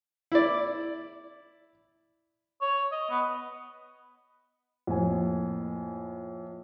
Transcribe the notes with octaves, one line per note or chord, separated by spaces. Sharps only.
E4 D5
C#5
D#5
B3
F2 A2 A#3 G#5